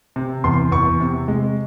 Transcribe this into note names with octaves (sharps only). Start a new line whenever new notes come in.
C3
E2 C6
E2 C#6
C3
G#3